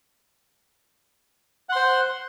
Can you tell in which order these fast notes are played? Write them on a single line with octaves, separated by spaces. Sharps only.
F#5 C6 C5